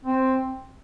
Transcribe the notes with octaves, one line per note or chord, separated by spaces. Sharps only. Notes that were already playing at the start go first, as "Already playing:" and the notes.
C4